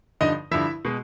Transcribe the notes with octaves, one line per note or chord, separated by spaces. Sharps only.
G2 D3 F3 D#4 D#5
G2 D3 F3 E4 E5
B2 G#3